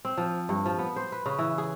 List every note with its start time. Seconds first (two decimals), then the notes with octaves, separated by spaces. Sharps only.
0.05 C4
0.18 F3
0.49 G2
0.66 F3
0.79 B3
0.96 C5
1.12 B4
1.26 C#3
1.39 E3
1.58 G#4